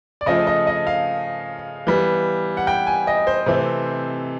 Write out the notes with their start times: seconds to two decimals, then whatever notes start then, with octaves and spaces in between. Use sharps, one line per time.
0.21 D5
0.26 C#3 F3 A3 D#5
0.47 D#5
0.67 D#5
0.87 F5
1.87 E3 G3 B3
2.57 F#5
2.67 G5
2.87 G#5
3.07 D#5
3.27 C5
3.46 C3 E3 A3 C4